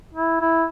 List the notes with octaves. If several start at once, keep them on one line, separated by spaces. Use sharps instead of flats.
E4
E4